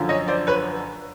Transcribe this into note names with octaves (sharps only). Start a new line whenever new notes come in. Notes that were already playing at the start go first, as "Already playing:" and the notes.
Already playing: F#2 D3 F3
C#5 D#5
C5 D5
B4 C#5